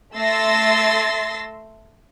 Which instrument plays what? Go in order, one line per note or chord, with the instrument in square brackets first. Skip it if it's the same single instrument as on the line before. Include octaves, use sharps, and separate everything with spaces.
[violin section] A3 C6 E6 A6 A#6 C7